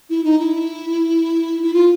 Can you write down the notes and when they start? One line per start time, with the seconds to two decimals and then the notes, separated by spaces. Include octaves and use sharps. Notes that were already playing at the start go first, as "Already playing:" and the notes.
0.10 E4
0.24 D#4
0.39 E4
1.63 E4
1.74 F4